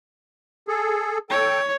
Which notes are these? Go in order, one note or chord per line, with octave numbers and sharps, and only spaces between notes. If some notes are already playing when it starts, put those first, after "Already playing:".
G#4 A4
A4 C#5 G5